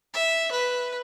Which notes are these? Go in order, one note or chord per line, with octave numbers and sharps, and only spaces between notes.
E5
B4